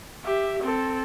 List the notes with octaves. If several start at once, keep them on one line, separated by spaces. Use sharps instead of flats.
G4 E5
C4 A4